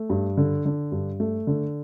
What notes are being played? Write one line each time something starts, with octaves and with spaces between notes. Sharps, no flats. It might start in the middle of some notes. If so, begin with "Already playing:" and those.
Already playing: A3
G2
D3
D3
G2
A3
D3